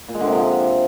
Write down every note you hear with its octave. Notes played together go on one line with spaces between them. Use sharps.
A#2
G#3
D3
C3
F3